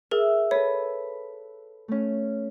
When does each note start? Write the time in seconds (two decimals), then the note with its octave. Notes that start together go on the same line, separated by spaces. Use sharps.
0.11 G#4 A#4 E5
0.51 A4 B4 C#5
1.88 A3 C#4